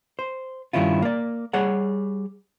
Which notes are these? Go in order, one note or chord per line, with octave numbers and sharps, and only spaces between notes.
C5
G2 C3 D#3 C#4 E4 F4
A#3 D5
G3 G#4 C#5 F#5